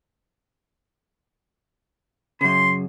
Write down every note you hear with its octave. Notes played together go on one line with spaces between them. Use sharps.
F#2 C#3 C6